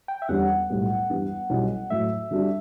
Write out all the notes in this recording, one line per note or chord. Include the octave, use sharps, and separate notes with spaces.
G5
E5
E2 D3 G3 C#4 F#5
B1 A2 G3 B3
G2 E3 G3 B3
B1 B2 G3 C#4 E4
A2 F#3 A3 E5
D3 G3 D4 F#4